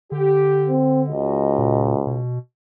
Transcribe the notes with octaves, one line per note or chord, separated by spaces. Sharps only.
D3 G4
C4
C#2 F#4 D#5
A#2
B2